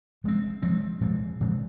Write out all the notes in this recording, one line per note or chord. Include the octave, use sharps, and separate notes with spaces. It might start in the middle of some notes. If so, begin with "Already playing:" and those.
F3 G#3 C4
F3 G#3 C4
A#2 F3 G#3 C4
A#2 F3 G#3 C4